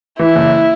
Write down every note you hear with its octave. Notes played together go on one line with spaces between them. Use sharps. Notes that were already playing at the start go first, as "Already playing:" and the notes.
E3 E4
F#1